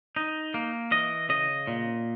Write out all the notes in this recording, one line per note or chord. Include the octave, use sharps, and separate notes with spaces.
D#4
A#3
E3 D#5
C#3 D#5
A#2